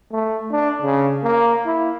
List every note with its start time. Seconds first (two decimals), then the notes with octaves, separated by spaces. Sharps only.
0.12 A3
0.52 D4
0.82 C#3
1.24 A#3
1.66 E4